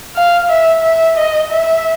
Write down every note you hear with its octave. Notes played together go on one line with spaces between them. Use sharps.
F5
E5
E5
D#5
E5